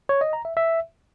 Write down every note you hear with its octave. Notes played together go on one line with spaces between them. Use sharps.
C#5
D#5
A#5
E5
E5